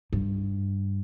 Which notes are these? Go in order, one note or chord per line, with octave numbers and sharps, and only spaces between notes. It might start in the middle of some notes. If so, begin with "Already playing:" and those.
G2